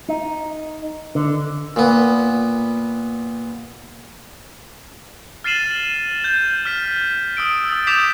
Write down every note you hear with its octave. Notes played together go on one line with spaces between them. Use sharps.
D#4
D3
A#2 B3
F6 A6 C7 D#7 E7 F#7
G6
F6 B6
D#6 E6 D7
D#6 A6
D6 D#6 G6 B6 E7 F7